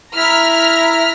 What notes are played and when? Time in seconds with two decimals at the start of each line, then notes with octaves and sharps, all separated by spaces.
0.16 E4 A#5 F6 B6